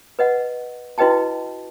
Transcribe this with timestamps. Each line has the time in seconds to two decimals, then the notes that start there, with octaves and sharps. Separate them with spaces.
0.19 B4 D#5 F#5
0.98 E4 F#4 B4 D#5 G5 A5